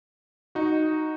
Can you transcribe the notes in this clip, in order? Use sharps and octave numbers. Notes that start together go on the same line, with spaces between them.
D#4 F#4